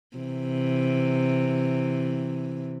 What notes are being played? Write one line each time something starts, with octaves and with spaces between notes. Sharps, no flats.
C3 E3